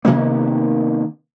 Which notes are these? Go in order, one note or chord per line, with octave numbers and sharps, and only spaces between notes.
C3 D#3 A#3 B3